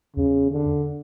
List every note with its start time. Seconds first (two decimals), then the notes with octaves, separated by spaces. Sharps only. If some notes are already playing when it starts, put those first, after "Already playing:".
0.16 E2 C#3
0.51 D3